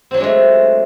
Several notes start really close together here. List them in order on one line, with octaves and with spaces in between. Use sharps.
C4 F#3 D4 G#3 A3